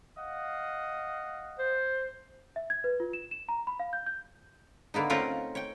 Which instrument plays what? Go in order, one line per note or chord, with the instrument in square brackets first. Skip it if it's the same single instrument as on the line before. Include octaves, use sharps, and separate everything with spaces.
[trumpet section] D#5 F5 F#5
[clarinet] C5
[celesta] E5
G#6
B4
F4
E7
E7
A#5
B5
F5
G6
G6
[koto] D3 A#3 B3 D#4
A3 C4 C#4 F4 A#4 F#5
C#5 G5